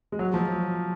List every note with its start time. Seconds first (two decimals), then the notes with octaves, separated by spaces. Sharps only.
0.12 G#3
0.19 F#3
0.34 F3